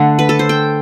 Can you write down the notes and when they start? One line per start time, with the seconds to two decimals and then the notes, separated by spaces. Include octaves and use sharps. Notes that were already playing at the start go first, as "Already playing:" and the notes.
Already playing: D3 A3 D4 F#5
0.19 B4
0.29 A4
0.39 C5
0.49 G5